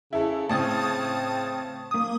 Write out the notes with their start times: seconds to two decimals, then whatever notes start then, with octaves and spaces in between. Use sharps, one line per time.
0.13 C#3 E4 A4
0.49 A2 C#3 C4 A5 D#6 A6
1.91 A#3 D#6